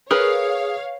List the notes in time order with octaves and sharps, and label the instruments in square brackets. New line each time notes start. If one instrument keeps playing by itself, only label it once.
[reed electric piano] G#4 D#6 [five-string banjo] A#4 B4 [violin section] C#5 F5